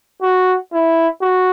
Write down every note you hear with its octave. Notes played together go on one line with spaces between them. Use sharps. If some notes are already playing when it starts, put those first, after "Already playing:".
F#4
E4
F#4